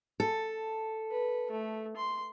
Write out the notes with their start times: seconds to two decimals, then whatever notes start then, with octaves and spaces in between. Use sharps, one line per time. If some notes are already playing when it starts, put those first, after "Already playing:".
0.20 A4
1.11 B4
1.51 A3
1.97 C6